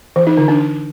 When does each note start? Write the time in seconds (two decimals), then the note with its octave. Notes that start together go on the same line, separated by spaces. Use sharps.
0.16 E3
0.27 D#4
0.37 D3
0.48 D4